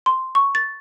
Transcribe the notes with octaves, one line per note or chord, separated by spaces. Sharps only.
C6
C#6
A6